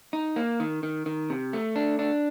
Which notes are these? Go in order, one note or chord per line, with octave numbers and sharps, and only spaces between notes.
D#4
A#3
D#3
D#3
D#3
C3
A3
D4
D4